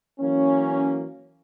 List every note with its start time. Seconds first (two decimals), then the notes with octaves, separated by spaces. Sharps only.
0.20 E3 F#3 A#3 C#4